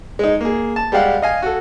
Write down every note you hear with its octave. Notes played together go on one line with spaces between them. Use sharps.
G#3 D#4
A#3 G#4
A5
G3 G#3 G4 F5 F#5
D#5 F5 G#5
F#4 A4